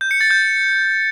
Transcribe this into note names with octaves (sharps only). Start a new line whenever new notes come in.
G6
C#7
A6
G6